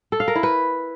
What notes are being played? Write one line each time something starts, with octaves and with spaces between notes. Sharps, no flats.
A4
F5
A#4
E4
B4